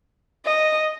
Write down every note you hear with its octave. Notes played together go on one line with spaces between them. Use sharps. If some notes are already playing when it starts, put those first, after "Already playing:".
D#5